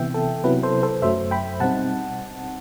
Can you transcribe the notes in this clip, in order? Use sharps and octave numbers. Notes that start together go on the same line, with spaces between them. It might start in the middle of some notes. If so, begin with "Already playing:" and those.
Already playing: C3 E3 B3 E5 G5
A4
C3 F#3 B3 E4 B4
A4 C5
A4 C5
F#2 F#3 A3 C5 E5
G5 B5
B2 G3 C4 D#4 F#5 A5